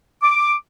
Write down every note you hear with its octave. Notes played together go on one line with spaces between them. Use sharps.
D6